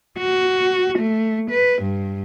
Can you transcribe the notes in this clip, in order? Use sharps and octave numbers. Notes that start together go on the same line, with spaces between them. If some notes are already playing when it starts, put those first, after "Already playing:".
F#4
A3
B4
G2